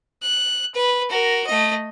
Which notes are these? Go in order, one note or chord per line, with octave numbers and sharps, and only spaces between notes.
F#6
B4
F#4 A#4
A3 D#5